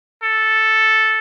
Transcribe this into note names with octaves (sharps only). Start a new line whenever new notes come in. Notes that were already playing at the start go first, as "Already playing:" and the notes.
A4